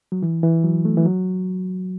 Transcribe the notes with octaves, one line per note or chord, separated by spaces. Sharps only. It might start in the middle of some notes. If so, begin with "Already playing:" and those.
F#3
E3
E3
F#3
A3
E3
F#3